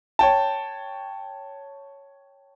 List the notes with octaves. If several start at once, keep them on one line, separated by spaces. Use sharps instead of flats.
C#5 G5 A5